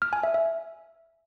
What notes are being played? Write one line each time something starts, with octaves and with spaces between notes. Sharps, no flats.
F6
G#5
E5
E5